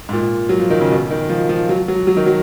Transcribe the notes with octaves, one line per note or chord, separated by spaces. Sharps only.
G#2
A#2
F#3
F3
D#3
C#3
B2
D#3
F3
F3
F#3
F#3
F#3
D#3
F#3